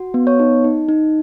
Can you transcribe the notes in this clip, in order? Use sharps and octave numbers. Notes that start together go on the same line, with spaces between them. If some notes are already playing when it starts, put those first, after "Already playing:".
Already playing: F#4
B3
C#5
D#4
D#4
D#4